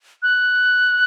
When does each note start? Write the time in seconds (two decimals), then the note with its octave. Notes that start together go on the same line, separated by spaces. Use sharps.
0.23 F#6